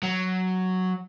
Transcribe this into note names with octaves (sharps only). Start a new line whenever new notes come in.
F#3